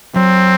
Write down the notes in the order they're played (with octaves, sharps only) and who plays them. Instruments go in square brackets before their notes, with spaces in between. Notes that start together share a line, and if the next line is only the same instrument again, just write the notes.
[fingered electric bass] F#3 [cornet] C4